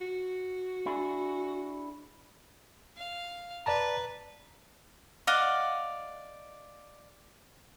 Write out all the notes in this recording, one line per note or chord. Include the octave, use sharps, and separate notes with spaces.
F#4
D4 E4 G#4
F5
B4 D5 A5 A#5
D5 D#5 F5 F#5